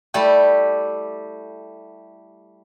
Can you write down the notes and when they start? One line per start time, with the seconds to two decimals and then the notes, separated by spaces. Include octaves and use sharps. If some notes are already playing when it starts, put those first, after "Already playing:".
0.14 G3 A3 E4 G4